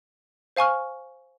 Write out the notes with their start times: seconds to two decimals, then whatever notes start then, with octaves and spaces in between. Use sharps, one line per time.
0.56 C5 F5 G#5 C#6 F6